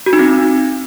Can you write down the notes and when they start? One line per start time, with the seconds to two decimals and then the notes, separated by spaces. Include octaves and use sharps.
0.06 F#4
0.13 D#4
0.19 C4